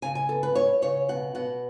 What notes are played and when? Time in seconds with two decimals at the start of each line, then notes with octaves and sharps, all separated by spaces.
0.02 C#3 G#5
0.15 G#5
0.29 B3 A4
0.43 B4
0.55 B3 C#5
0.82 C#3 C#5
1.09 B2 F#5
1.35 B2 F#5